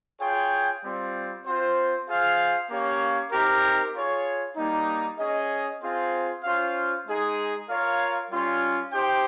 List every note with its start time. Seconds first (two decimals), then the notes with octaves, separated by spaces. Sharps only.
0.21 F4 G#4 C#5 G5
0.83 G3 C4 F4
1.46 C4 F4 C5
2.08 F4 G#4 C5 F5
2.70 A#3 C#4 G4 C#5 F5
3.32 C4 D#4 G4 A#4
3.94 F4 G#4 C#5
4.57 G3 A#3 D#4
5.19 C#4 G#4 D#5
5.82 C4 F4 G#4 C5 F5
6.44 C#4 F4 C5 F5
7.06 G#3 D#4 G#4
7.68 F4 A#4 C#5 F5
8.31 G3 C#4 F4
8.93 D#4 G4 C5 G5